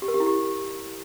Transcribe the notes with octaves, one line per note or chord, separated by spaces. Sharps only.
G4
A#4
G4
E4
G4